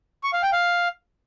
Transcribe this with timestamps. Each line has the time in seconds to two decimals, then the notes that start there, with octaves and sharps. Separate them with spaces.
0.24 C#6
0.33 F5
0.43 G5
0.52 F5